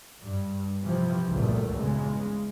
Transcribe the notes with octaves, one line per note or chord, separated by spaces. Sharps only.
G2
C3 E3 F3
G#1 C#2 G2 A#2 F#3 A3
E2 C#3 G#3